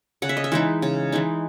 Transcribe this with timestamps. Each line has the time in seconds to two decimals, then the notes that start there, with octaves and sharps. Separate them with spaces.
0.22 C#3 F#5
0.29 E5
0.37 D#5
0.44 E5
0.52 E3 G#3 D#4
0.82 C#3
1.12 E3 G#3 D#4